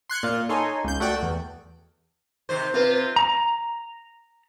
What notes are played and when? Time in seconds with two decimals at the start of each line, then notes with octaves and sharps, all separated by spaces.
0.10 C6 F#6 G#6 C#7
0.23 A#2 F4
0.49 D#4 A4 C#5 G#5 C6
0.84 C#2 G6
1.00 A3 F#4 D5 G5
1.22 E2
2.49 C3 D#3 C5
2.74 C3 C4 F4 B4
3.16 A#5